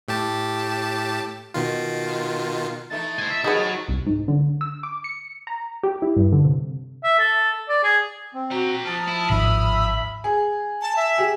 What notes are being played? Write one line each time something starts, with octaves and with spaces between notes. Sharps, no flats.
A2 G4 A5
B2 D#3 F4
E3 A3 D#4 A5
C5 G#5
E5
G#2 D#3 D#4 F#4 G#4 B4 C#5
C2
G#2
D3
E6
D6
C#7
A#5
G4
E4
G2
D3
C3
E5
A4
D5
G#4
C4
F#4 C5 A#5
F3 A5 D#6 F6
E4
D1 G#1 D#3 E5 B5
G#4
A5
E5
G4 G#4